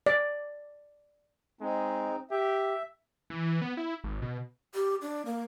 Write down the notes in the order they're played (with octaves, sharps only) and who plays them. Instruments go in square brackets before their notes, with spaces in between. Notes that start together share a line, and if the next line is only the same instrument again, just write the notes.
[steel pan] D5
[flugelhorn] G#3 [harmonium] C4 D#4
[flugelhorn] G4 [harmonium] E5
[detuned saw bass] E3
B3
E4
G#1
B2
[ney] G4
D4
A#3